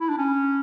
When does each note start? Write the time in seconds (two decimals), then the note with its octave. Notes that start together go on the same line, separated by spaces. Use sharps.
0.01 E4
0.09 D4
0.18 C#4